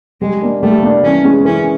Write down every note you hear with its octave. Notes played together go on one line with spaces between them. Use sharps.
G3 G#3
A#3 D4
G3 A3
A#3 D4
E3 C#4
G#3 C#4
E3 C#4